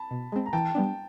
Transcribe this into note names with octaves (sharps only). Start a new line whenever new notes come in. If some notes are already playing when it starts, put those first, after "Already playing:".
Already playing: A5 B5
B2
G#3 C4
A#5
E3 G5 A5
G3 B3 D4